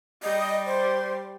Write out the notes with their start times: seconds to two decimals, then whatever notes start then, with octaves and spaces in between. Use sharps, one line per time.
0.22 G3 D#5
0.66 C5